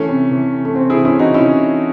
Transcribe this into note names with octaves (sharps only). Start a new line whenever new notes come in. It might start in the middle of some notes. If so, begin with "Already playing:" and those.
Already playing: E3 A3 C#4
C3
E3
C3
A3
C3 C4
E4 G#4
E3
C#4 E4
E3 D#4 F#4
C#4 E4
E3